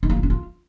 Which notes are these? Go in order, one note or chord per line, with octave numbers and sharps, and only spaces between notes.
D#4
A#3
F4
C#4
F4